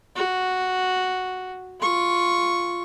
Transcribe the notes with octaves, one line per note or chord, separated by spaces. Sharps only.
F#4
F4 C#6